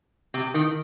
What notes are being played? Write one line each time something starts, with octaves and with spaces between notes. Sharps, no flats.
C3
D#3